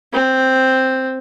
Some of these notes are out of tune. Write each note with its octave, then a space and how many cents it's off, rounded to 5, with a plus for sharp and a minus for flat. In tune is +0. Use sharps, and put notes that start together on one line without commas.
C4 +0